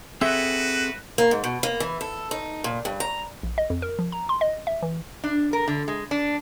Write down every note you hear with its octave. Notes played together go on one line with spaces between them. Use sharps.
C4 F#4 G#4 A4 B4 E5
A#3
G#2
B2
A#3
E3
A4
D#4
A#2
G2
A#5
A#1
D#5
F2
A#4
F3
A#5
C6
D#5
E5
E3
D4
A#4
D3
G#3
D4